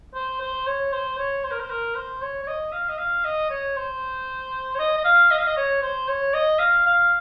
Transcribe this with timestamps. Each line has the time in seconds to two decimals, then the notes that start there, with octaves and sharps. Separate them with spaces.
0.14 C5
0.41 C5
0.66 C#5
0.92 C5
1.18 C#5
1.43 C5
1.51 A#4
1.59 C5
1.70 A#4
1.95 C5
2.21 C#5
2.42 C#5
2.47 D#5
2.72 F5
2.89 D#5
2.98 F5
3.24 D#5
3.50 C#5
3.76 C5
4.75 C#5
4.79 D#5
4.97 D#5
5.04 F5
5.31 D#5
5.38 F5
5.46 D#5
5.57 C#5
5.82 C5
6.08 C#5
6.33 D#5
6.59 F5
6.86 F5